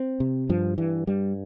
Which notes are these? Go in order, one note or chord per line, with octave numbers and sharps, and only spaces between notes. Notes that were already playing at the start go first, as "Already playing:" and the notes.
Already playing: C4
C3
G2 F3
G2 E3
G2 G3